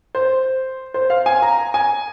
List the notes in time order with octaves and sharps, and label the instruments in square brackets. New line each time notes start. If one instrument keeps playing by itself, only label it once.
[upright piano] C5
C5
F5
G#5
A#5
G#5